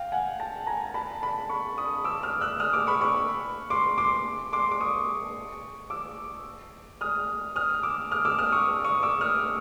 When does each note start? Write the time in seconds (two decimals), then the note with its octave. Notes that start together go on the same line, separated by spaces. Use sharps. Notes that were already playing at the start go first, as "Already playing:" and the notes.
Already playing: F5 G5
0.12 F#5 G#5
0.40 G5 A5
0.67 G#5 A#5
0.94 A5 B5
1.22 A5 B5
1.49 B5 C#6
1.78 C#6 D#6
2.04 D6 E6
2.23 D#6 F6
2.41 E6 F#6
2.60 D#6 F6
2.73 D6 E6
2.87 B5 C#6
3.01 B5 C#6
3.70 C6 D6
3.98 C6 D6
4.53 C6 D6
4.71 D6
4.81 C#6 D#6
5.90 D6 E6
7.01 D#6 F6
7.56 D#6 F6
7.83 D6 E6
8.11 D#6 F6
8.25 D6 E6
8.39 D#6 F6
8.52 C#6 D#6
8.84 C#6 D#6
9.03 D6 E6
9.21 D#6 F6